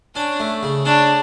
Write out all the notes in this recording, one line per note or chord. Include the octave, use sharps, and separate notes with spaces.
C#4 D4
A3
C#3
C#4 D4